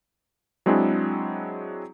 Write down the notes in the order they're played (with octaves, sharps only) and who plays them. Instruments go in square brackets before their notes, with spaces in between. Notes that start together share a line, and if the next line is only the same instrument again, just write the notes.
[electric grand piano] F#3 G#3 C4 D4 E4 G#4